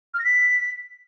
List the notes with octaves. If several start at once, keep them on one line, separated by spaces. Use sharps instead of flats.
F6
A#6
B6